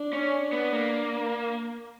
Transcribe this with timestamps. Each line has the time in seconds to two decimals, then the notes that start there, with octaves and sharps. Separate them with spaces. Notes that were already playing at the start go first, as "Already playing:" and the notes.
Already playing: D4
0.13 C#4
0.53 B3
0.73 A#3